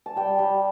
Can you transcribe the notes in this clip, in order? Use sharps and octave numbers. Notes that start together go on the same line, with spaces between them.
A5
G3 G5
G3